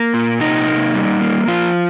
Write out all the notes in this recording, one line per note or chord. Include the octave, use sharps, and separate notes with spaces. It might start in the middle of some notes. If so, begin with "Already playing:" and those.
Already playing: A#3
A#2
C3 D#4
A#3
G3
A#3
F3 F4